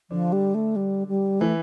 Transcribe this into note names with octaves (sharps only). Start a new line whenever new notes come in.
D3 F3 D4
G3
A3
G3
G3
E3 A3 E4